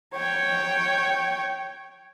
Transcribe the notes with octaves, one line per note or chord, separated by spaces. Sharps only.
C#5 G5